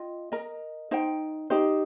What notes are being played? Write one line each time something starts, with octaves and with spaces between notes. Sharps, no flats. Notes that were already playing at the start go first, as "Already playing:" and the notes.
Already playing: F4 D#5 G5
A#4 D#5 A#5
D#4 C5 G5
D#4 G4 C5